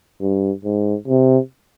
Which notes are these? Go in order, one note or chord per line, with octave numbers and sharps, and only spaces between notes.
G2
G#2
C3